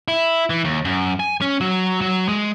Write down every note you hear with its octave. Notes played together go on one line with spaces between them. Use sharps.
E4
E3
D#2
F#2
G#5
C#4
F#3
F#3
G#3